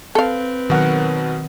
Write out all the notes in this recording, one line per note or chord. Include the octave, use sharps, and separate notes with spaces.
C4 A4 B4 F5
B2 D#3 F#3 A#4 F#5